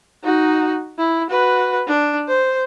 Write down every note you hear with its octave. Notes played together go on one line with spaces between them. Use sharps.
D#4 F#4
E4
F#4 B4
D4
C5